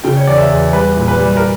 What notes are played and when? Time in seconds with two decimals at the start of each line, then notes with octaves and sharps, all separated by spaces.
0.04 C#3 G5
0.17 C#5
0.27 E2 D5
0.38 E5
0.50 E2
0.73 G3 B4
0.97 A#2
1.08 B4
1.19 G3
1.37 A#4